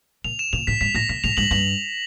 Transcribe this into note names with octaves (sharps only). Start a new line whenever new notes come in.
A#2 F7
E7
A#2 F7
A2 B6
G#2 B6
A2 A#6
A#2 B6
A2 F7
G#2 F#7
G2 F#7